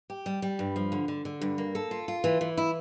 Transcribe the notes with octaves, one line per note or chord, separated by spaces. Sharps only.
G4
G3
G3
G2
F3
D3
D3
D3
G2
A#3
A4
F4
F4
E3
E3
E4